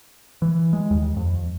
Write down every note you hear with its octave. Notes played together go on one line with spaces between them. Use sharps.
E3
G#3
D#2
F2